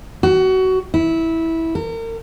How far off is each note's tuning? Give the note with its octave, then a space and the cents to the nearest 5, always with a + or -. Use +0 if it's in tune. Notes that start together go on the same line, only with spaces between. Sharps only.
F#4 +20
E4 -15
A#4 -40